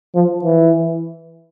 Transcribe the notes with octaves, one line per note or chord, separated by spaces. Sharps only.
F3
E3